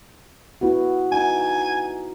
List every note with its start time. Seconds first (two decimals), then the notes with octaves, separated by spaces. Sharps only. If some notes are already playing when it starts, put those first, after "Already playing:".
0.61 B3 E4 F#4
1.12 D#4 G#5